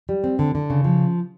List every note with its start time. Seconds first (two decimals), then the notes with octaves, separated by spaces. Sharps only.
0.09 G3
0.24 C4
0.39 D3
0.55 D3
0.70 C#3
0.84 F3